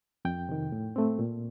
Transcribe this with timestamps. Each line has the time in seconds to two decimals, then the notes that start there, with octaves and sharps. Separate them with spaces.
0.25 F2 G5
0.49 C3 D#3
0.72 A2
0.96 A3 C4
1.19 A#2